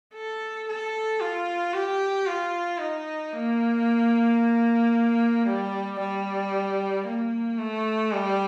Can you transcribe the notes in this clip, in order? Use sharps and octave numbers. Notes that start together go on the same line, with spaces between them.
A4
A4
F4
G4
F4
D#4
A#3
G3
G3
A#3
A3
G3